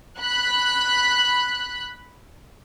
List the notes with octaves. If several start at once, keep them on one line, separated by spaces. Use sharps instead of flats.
B5 F#6